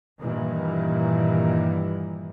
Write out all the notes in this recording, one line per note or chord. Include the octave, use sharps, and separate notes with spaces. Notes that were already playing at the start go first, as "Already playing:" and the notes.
G2 A#2 D#3 E3